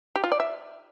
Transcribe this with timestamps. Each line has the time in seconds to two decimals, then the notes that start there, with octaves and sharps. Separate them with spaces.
0.16 G4
0.24 F4
0.32 D5
0.40 E5